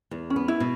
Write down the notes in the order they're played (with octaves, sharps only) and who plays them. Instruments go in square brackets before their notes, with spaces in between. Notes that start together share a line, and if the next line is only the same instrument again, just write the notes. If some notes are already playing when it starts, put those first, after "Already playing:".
[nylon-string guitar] E2
[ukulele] C#4
[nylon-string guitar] B3
[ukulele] E4
[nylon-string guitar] B2